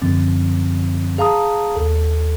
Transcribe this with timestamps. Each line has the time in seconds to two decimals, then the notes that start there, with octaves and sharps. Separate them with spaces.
0.02 F#2 D3 F3 C4
1.18 G#4 F5 A5 A#5 D#6
1.76 D#2 A4